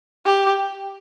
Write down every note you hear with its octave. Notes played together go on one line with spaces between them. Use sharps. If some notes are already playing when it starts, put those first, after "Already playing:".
G4